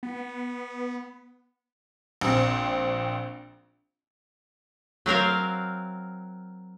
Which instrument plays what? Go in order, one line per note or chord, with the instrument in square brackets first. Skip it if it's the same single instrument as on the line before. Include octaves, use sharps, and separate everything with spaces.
[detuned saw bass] B3
[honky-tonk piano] A#1 C4
[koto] F#3 C4 A#4 F5